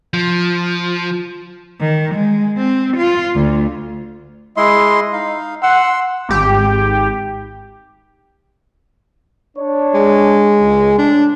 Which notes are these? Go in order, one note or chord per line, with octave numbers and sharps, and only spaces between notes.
F3
D#3
G#3
C4
F4
D2
G#3 E4 D#5 C6
D#4 F5
F#5 C6 E6
G#1 G4
D4 C#5
G#3
C#2
A2 D4